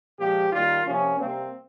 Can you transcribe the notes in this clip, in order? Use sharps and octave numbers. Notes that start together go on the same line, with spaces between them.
A#2 F3 G#3 G4
D#3 G3 A#3 F4
C3 F3 A#3 C#4
C3 G3 A#3 C4